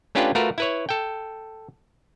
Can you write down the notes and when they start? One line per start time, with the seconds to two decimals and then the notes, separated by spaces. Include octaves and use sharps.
0.15 A3 C#4 D4 F4 G4 B4
0.35 A3 F4 F#4 A#4 B4
0.58 E4 B4 C#5
0.89 A4 G5